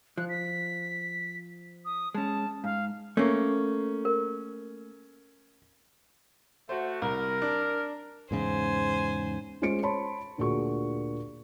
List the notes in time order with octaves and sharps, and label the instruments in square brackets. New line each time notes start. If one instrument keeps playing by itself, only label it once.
[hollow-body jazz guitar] F3 [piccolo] F#6
[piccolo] B6
D#6
[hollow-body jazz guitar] G#3 C#4 [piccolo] A5
[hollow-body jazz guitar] G#2 [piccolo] F5
[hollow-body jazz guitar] A3 A#3 [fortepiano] C#4
[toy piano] A#4
[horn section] A3 F#4 [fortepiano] C5
[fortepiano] C2 [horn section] A#4
[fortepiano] D4
[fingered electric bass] E2 G#2 C#3 [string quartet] C5 G#5
[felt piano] G#3 C#4 F4 C5 C#7 D7
C5 C#5 A5 B5 C6
D2 A#2 F#4 G#4 C#6